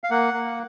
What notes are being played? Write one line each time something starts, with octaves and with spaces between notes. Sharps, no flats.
F5
A#3 F#5
A#3